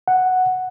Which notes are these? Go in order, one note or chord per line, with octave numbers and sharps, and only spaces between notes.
F#5